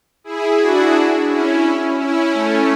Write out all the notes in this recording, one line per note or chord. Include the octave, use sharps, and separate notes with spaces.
E4 G#4
D4 F#4
C#4 E4
C#4 E4
A3 C#4